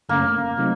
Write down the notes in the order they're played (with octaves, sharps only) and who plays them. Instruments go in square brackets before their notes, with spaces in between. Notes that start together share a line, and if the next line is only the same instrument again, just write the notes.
[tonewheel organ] F#2 C#3 A3 C#4 [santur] A#3
[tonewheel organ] C3 F#3 A3 C4 D#4